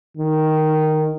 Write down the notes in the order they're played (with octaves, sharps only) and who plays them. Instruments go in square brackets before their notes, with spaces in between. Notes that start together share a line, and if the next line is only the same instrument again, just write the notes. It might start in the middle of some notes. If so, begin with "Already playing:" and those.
[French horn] D#3